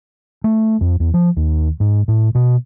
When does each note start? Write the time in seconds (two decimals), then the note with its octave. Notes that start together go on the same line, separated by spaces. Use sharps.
0.44 A3
0.81 F2
1.00 E2
1.14 F3
1.37 D#2
1.80 G#2
2.08 A2
2.35 B2